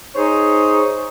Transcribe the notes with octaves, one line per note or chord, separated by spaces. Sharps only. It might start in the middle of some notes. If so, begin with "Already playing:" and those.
D#4 G#4 C5 C#5